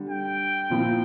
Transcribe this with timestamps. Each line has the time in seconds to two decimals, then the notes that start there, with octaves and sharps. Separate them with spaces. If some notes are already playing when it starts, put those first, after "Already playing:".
Already playing: D3 G3
0.09 G5
0.70 A#2 F3 C4 E4